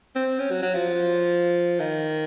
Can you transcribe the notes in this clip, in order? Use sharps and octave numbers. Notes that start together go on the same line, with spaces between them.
C4
C#4
F#3
F#3
F3
D#3